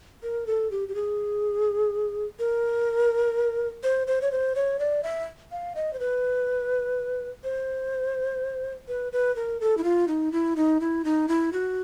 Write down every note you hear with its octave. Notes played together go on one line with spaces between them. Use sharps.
A#4
A4
G4
G4
G#4
A#4
C5
C5
C#5
C5
C#5
D5
E5
F5
D#5
C5
B4
C5
B4
B4
A#4
A4
E4
F4
D#4
E4
D#4
E4
D#4
E4
F#4